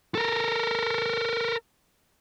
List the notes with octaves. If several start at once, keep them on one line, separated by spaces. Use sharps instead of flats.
A4 A#4